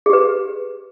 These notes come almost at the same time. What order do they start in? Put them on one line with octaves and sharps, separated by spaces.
G#4 G4 B4